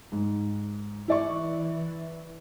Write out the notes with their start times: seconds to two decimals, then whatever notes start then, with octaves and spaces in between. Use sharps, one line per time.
0.12 G#2
1.08 E3 E4 D5 C#6